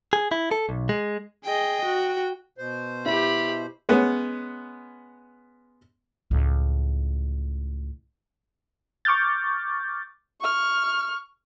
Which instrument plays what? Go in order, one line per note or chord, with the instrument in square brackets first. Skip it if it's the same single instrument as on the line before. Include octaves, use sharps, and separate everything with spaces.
[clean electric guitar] G#4
E4
A4
B1
G#3
[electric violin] G#4 D#5 [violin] G5
[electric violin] F#4
[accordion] B2 C5
[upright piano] E4 [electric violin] G4 B5
[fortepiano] G#3 B3 C#4
[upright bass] C#2 A2
[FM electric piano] C#6 D6 F6 G6 A6
[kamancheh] C#6 F6